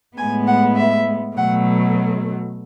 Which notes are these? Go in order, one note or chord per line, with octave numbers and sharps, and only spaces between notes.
A2 G#3 B3 G#5
F#5
E5
B2 F#3 A3 F#5